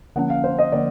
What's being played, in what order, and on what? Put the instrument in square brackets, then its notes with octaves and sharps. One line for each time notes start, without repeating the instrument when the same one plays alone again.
[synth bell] D3 F3 A#3 C#4 [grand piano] F#5
[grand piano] F5
C5
D#5
[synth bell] D3 F3 A#3 [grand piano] D5